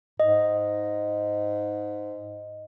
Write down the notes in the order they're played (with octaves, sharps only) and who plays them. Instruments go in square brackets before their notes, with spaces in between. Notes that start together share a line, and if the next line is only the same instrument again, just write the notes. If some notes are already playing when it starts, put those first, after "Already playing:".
[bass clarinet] G#2 [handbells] D#5